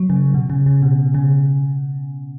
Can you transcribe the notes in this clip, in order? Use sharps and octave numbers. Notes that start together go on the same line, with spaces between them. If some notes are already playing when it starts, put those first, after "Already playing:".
Already playing: F#3
C#3
B2
C#3
C#3
B2
C#3